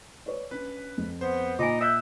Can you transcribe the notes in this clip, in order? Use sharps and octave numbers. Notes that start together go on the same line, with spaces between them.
B4 C#5 D5
C#4 D4 B4
F2
B3 C5
A#2 D#4 F4 G#5 D6
D#5 E5 D#6 F#6 G6